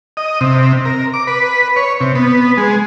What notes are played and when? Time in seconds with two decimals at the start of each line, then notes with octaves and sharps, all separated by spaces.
0.17 D#5
0.41 C3
0.85 A#4
1.14 D6
1.27 B4
1.76 C#5
2.01 C3
2.15 B3
2.57 G#3